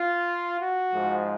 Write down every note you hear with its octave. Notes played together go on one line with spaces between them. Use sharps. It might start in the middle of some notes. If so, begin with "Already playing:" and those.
Already playing: F4
F#4
G#2 F3 G#3